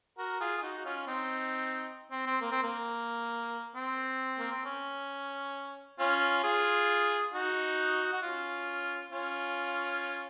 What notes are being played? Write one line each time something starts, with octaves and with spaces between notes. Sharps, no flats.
F#4 A#4
F4 G#4
G#4
D#4 F#4
F#4
C#4 F4
C4 D#4
C4
C4
A#3
C4
A#3
C4
A#3
C4
C#4
C#4 F4
F4 G#4
D#4 F#4
F#4
C#4 F4
C#4 F4